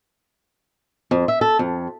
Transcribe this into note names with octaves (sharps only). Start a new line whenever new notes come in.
F2
E5
A4
F2